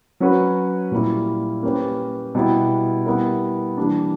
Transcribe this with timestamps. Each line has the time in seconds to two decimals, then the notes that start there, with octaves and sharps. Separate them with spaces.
0.20 F#3 C#4 F#4 B4
0.91 A#2 G3 A#3 E4
1.63 A#3 C#4 G4 B4
2.35 B2 G3 B3 E4 G4
3.06 G3 B3 E4 A#4
3.77 E3 G3 A#3 D4